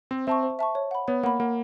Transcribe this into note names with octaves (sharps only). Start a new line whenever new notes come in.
C4 C5
C4 E5 A5 C#6
C5
E5 A5 C#6
C#5
F#5 B5
B3 C#5
A#3 F#5 B5
A#3 F#5